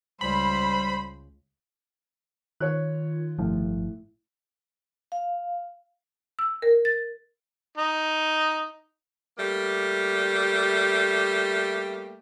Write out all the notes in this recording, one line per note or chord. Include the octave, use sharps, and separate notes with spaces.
C#2 G3 C5 B5
D#3 F4 C#5 F#6
G1 A2 F3
F5
E6
A#4
A6
D#4
G3 A3 A#3